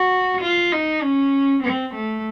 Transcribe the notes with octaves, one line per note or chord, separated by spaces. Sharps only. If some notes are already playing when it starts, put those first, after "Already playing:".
Already playing: F#4
F4
D#4
C#4
C4
A3